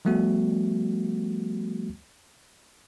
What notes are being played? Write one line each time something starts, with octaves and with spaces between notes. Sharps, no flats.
F3 G3 A3 B3 F#4